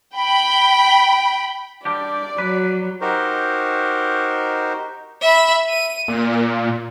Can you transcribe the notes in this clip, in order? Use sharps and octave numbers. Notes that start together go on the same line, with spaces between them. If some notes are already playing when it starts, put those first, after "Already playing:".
G5 B5
G3 D4 G4 D5
F#3 B4
D#4 F#4 G4 A#4 C5
E5 B5
D#7
A#2